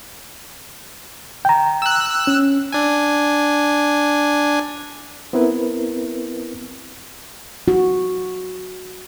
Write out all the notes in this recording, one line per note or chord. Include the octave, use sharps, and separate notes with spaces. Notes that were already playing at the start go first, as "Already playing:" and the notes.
G5 A#5
E6 F#6
C#4
D4 G#5
B3 C4 E4 A#4 B4
F#4